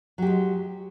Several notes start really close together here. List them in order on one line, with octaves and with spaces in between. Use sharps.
F#3 G4 G#3